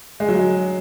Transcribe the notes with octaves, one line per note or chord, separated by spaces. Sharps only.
G#3
F#3
G#3